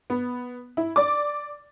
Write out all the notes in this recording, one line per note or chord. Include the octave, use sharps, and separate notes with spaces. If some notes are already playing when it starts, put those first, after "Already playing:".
B3
E4
D5 D6